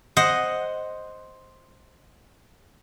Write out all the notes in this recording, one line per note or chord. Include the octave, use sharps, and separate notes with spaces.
C5 D#5 F#5